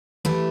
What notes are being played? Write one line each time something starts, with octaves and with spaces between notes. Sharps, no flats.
E3 A3 E4 G4